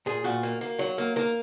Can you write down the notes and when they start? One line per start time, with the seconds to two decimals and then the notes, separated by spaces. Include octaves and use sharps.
0.06 A#2 G#4
0.24 A#2 F#4
0.43 A#3
0.61 A#3
0.79 F#3
0.98 A#3
1.16 A#3 A#4